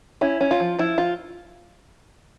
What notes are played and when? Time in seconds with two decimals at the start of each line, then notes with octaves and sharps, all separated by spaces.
0.21 C#4 E4
0.41 C#4
0.51 F4
0.60 F3
0.79 F3 E4
0.98 F3 F4